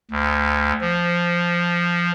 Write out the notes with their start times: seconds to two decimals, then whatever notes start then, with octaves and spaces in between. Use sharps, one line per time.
0.11 D2
0.81 F3